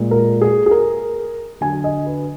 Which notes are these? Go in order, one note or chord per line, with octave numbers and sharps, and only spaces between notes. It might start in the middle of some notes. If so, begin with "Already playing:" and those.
Already playing: A#2 G#3
A#4
G#4
G#4
A#4
D3 F#3 G#5
D#5
B4